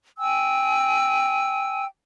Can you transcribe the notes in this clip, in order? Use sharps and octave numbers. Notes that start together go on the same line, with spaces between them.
G5 G#5 E6